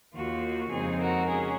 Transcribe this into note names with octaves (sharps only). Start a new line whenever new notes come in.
D#2 D#3 A#3 F4 F#4
F2 C#3 G#3 C4 D#4 G#4
F#4 A#4
C#4 G#4